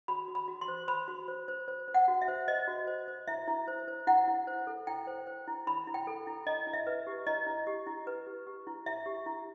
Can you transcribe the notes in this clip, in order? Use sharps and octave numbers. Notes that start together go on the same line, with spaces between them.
F#4 B5
F#4
B5
F#4
C6
C5
C5 B5
F#4
C5
C5
C5
C5
F#5
F#4
E5
C5
C5 D#5
F#4
C5
C5
E4 E5
E4
C5
C5
E4 F#5
E4
C5
A4
E4 G5
C5
C5
E4
E4 B5
E4
G5
A4
E4
E4 D#5
E4
E5
B4
G4
E4 D#5
E4
G4
E4
B4
G4
G4
E4
E4 E5
G4
E4